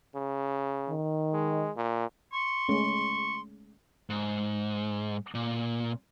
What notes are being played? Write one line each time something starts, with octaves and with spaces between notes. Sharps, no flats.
C#3
D#3
G#3
A#2
C6 C#6
G#3 A3 C#4 C#6
G#2
A#2